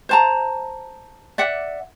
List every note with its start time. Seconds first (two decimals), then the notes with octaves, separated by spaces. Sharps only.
0.09 C5 A5 A#5
1.38 D5 E5 F#5